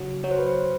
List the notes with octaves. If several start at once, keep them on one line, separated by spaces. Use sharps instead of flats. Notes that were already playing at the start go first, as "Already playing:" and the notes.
Already playing: C#3 F#3
F#3 C#5
C5
B4
C5